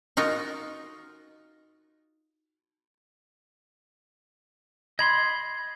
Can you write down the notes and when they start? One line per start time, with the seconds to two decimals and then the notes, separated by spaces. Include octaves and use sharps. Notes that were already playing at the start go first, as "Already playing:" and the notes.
0.17 D#4 F4 F#4 A#4
4.99 D#5 B5 C6 G#6